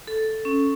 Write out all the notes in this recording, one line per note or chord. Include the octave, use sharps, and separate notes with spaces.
A4
C#4